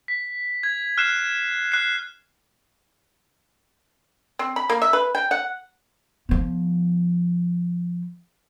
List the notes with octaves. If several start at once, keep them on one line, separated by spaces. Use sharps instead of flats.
B6
G#6
F6 F#6 C7 E7
F#6 C7
C4
B5
A#3
E5
B4
G5
F#5
F3 B3